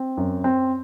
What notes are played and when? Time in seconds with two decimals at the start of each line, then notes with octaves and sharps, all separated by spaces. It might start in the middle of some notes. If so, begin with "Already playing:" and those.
Already playing: C4
0.17 F#2
0.44 C4